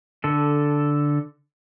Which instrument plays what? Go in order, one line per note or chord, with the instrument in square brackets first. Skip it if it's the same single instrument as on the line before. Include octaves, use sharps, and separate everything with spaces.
[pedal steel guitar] D3 A4